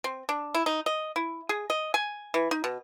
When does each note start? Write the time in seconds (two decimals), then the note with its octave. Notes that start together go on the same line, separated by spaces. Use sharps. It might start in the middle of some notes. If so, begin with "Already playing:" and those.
0.04 C4
0.29 D4
0.54 E4
0.66 D#4
0.86 D#5
1.16 E4
1.49 G#4
1.70 D#5
1.94 G#5
2.34 E3
2.51 D#4
2.64 B2